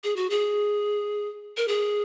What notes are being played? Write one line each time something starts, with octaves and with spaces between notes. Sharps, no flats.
G#4
F#4
G#4
A#4
G#4